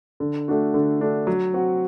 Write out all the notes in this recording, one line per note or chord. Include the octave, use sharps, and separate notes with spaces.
D3
A3 D4 F#4
D3
A3 D4 F#4
F#3
C4 F#4